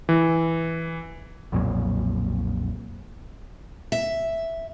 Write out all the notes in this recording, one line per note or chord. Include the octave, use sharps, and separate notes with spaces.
E3
B1 F2 A#2 F#3
E5